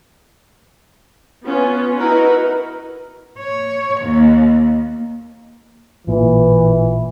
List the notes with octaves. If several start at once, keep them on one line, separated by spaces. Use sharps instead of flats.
B3 C#4 F4
D#4 E4 F#4 A#4 B4
C#5
D#2
A1 A#2 E3